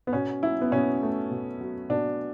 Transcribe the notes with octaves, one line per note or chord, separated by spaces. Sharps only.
B3
B2 C#4
F#3 E4
B3
B2 C#4
A3
B2
F#3
B2 D4